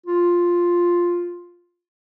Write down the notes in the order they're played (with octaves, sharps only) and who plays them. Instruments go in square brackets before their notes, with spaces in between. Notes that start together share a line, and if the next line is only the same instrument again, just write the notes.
[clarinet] F4